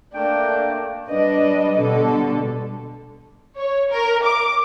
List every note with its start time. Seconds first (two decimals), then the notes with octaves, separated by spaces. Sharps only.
0.14 A3 A#3 D4 G5
1.08 G3 D4 B4 D#5
1.78 B2 D3 G3 A4
3.57 C#5
3.91 A#4
4.24 D6